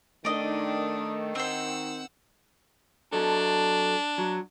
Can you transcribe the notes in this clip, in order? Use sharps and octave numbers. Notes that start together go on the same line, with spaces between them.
D#3 A3 D4 D5 D#5
C4 C5 F#5 E6
F#3 D4 A4
F#3